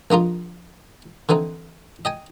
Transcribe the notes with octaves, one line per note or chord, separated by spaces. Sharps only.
A#1 A#3 D#4 F4
D3 E3 C4 D#4
D#5 G5 G#5